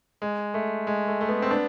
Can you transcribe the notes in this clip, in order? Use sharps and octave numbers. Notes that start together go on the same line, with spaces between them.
G#3
A3
G#3
A3
A3
G#3 B3
C4
B3 D4